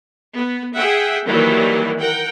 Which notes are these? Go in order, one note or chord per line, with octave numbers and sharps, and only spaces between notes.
B3
G#4 E5 F#5 G5
D#3 E3 F#3 G3 A#3 E4
A#4 F#5 G5